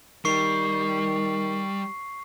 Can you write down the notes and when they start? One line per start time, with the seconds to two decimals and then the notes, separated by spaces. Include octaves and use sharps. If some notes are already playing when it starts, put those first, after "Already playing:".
0.25 D#3 G3 C#6 C7